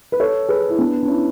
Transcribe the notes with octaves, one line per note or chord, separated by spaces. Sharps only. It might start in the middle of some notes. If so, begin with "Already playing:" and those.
B4
A4 C#5
G#4 B4
E4
B3 D4
D4
C#4 E4